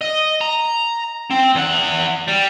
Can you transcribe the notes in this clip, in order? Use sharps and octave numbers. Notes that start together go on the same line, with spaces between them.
D#5
A#5
C4
E2 F#5
G3